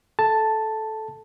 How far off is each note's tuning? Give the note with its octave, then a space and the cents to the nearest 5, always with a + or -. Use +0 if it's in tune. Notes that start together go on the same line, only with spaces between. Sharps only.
A4 -15 A5 +0